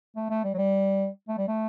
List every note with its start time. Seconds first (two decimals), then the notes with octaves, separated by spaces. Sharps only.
0.16 A3
0.30 A3
0.44 G3
0.54 F#3
0.58 G3
1.28 A3
1.38 G3
1.48 A3